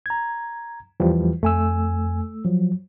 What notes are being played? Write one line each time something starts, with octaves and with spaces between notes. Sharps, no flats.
A#5 G#6
E2 E3 F3 G3
F2 A3 G#5 E6
F3 F#3